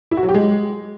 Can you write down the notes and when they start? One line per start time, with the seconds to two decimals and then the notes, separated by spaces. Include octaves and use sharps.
0.11 E4
0.17 F#4
0.23 F#3
0.29 G4
0.34 G#3